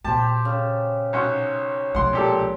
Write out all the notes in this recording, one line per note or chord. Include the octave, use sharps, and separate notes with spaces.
A#2 B3 G4 C5 A5
C#3
B1 C#4 F#5
B1 F3 G#3 F#5 C6
A#2 G4 A4